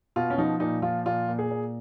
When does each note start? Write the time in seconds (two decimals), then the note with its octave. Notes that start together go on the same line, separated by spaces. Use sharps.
0.16 B2 F4
0.30 C#4
0.38 F3 D#4
0.60 A#2 D#4
0.82 F3 F4
1.06 A#2 F4
1.28 A#2
1.39 G#4
1.51 A#2